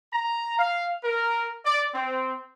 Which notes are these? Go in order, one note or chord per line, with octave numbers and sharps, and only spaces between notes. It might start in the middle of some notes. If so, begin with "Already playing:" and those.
A#5
F5
A#4
D5
C4